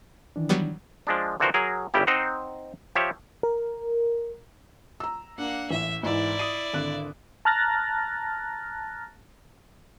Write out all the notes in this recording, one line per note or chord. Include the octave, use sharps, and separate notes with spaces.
D#3 E3 D4
F#3 G3 B3
F3 G#3 D4
D3 E3 F3 F#4 A#4 C5
F#3 G#4 A#4
G1 C#3 G3 E4 G4
C4 D#4 C5 D#5 F#5 A#5
F3 G4 C#5 E5
A#4
A#5 E6
A#3 D4 F#5
A1 E5
G#2 E3 E4 D5
D#6 C7 D#7
G#1 D3 F#6
A5 A#5 F6 F#6 A6 A#6